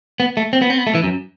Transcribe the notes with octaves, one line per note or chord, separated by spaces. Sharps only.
B3
A3
C4
B3
C4
B3
A3
E3
F#2